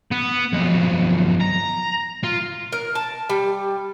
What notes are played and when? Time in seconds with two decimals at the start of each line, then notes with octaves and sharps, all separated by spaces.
0.11 B3
0.53 B1 F2
1.41 A#5
2.24 F4
2.72 A#4
2.95 A5
3.30 G3